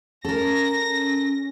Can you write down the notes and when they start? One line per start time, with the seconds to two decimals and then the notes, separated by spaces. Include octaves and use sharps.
0.25 C#4 A4 A#4 A#6